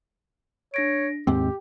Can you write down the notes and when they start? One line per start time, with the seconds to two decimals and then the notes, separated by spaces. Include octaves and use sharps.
0.74 D4 C#5 A#6 D7
1.27 D#2 G#2 C4 G4 G5